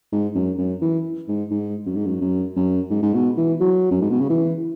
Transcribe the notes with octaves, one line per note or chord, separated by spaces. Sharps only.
G#2
F#2
F#2
E3
G#2
G#2
F#2
G#2
F#2
F#2
F#2
G#2
G#2
B2
E3
F#3
F#2
G#2
B2
C#3
E3